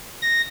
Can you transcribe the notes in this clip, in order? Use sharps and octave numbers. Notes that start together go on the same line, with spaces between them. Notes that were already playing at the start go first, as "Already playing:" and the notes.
A#6